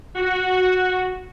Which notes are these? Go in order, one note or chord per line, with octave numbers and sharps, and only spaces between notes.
F#4